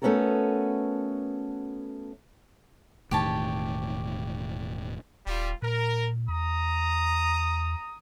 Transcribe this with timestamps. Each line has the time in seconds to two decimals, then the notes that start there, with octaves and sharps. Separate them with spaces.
0.02 A3 B3 C#4 F#4 A4 A#4
3.11 E1 A2 D#3 G4 C#5 A5
5.27 D#1 G3 F4
5.62 A#2 A#4
6.28 E2 A#5 D#6